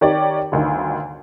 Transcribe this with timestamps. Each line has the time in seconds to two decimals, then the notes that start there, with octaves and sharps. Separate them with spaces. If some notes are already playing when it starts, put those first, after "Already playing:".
0.01 D#3 G4 C#5 D5
0.52 G1 D2 D#3